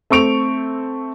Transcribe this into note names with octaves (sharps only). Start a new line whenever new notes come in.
A3 C4 C#6 D7 F7